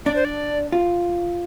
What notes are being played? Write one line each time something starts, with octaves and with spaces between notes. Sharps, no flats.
D4 D5
C5
D5
F4